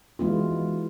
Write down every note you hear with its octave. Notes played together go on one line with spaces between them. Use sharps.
E3 G#3 B3 F4 F#4